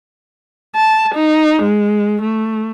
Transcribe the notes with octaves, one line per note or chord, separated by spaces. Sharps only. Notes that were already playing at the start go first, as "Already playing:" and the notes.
A5
D#4
G#3
A3